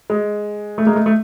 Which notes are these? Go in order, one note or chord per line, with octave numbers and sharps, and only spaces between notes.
G#3
A3
G#3 A#3
A3
A3